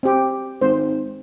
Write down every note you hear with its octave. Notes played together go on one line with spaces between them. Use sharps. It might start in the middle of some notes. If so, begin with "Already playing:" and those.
C4 G4
G#1 C5